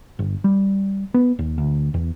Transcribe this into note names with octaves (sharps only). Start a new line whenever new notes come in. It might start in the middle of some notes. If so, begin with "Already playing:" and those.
G1
G3
B3
D#2
D2
E2